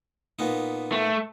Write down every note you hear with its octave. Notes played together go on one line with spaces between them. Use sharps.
A#2 B3 D#4
A3